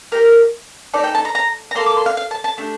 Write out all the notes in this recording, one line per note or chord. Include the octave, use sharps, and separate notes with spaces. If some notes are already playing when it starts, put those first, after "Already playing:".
A#3 D#4 G4 A#4
A3 D#4 A4 D5
G5
A5
A#5
A#5
A#5
A#3 F4 A4 C6
D6
C6
F5
F5
A5
A5
A3 D4 G4